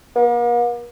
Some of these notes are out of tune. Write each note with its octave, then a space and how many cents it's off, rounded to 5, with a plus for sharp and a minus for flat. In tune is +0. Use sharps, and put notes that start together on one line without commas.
A#3 +45